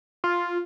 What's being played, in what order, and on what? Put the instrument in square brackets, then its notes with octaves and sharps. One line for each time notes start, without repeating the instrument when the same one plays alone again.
[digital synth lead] F4